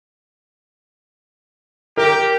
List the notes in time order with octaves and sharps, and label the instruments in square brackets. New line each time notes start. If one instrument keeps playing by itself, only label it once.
[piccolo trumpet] G4 [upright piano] A#4